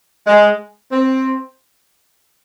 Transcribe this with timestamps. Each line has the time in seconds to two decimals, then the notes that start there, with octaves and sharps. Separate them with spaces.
0.27 G#3
0.92 C4